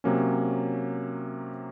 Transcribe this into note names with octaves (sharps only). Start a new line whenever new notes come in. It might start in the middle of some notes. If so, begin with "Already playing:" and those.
C3 F#3 A#3 C#4